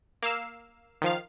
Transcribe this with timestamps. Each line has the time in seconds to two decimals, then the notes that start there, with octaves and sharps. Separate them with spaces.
0.22 A#3 F5 E6 C7
1.02 D#3 F3 F5